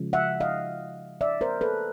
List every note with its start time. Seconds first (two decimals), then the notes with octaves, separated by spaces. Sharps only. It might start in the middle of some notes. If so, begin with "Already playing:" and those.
Already playing: C#3 F3 G#3
0.13 E5 F#5
0.40 D#5 F5
1.21 D5 E5
1.41 A#4 C5
1.61 A4 B4